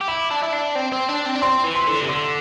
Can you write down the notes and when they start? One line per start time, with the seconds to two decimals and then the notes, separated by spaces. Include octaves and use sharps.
0.01 G4
0.08 E4 D6
0.31 D4
0.43 E4
0.53 D4
0.75 C4
0.92 C4
1.09 D4
1.25 C4
1.35 D4
1.42 C4 C6
1.64 E3
1.76 C6
1.87 D3
2.00 C3
2.09 D3 C6